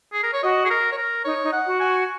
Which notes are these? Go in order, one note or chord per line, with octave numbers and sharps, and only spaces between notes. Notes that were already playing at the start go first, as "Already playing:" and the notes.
G#4
A#4
C#5
F#4 D#5
G#4
A#4
C#5
A#4
D#4 C#5
D#4
F#5
F#4
G#5